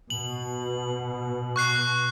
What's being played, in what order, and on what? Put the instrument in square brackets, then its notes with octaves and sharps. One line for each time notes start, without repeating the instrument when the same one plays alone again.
[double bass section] B2 [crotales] F#7
[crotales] C#6 F#6 C7